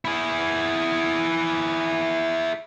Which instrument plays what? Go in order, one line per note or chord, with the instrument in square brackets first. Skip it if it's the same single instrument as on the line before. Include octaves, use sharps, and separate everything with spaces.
[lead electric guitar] E4 G#4